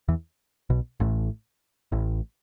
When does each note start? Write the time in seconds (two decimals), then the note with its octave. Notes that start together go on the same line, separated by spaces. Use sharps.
0.08 E2 E3
0.70 B1 B2
1.00 A1 A2
1.92 A1 A2